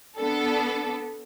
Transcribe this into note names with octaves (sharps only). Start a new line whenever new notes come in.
B3 D4 A4